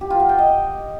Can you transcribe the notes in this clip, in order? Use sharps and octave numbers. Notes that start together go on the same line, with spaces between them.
G4
F4
F#5
G5
D#5